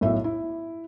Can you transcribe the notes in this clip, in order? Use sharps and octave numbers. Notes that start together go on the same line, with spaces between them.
B1 A2 E5
E4